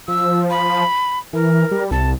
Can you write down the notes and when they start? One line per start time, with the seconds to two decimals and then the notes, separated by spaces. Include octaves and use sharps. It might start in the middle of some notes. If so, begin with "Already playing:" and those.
0.08 F3 E6
0.50 B5
1.33 E3 A#4
1.71 G3
1.91 C2 A5